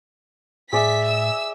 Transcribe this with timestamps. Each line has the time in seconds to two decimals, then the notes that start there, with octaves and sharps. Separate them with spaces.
0.73 A2 G#4 D5 E5 B6
1.07 E6